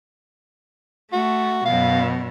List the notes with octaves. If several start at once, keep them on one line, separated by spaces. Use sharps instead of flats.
A3 F#4
F#2 B2 F5